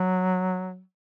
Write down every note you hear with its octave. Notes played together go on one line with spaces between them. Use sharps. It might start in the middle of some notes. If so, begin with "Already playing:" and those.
Already playing: F#3